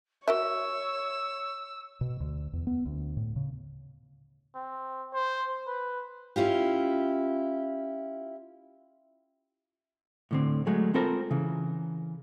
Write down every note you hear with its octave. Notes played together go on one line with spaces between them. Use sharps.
F#4 A#4 C#5 E5 E6
B2
D2
E2
B3
D2
A2
C#3
C4
C5
B4
C#4 E4 F4 G4
A2 D3 C4
F#3 G#3 A3
C4 F4 A4 A#4 C5 B5
C#3 E3